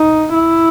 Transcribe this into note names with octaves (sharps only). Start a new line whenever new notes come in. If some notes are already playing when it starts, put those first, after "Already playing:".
Already playing: D#4
E4